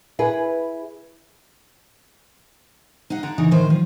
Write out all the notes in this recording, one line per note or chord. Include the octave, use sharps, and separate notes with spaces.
E4 G#4 B4
D#4 F5 F#5
D3 F#5 A#5
C#3 E3 D#4
A2 D#3 C5
F3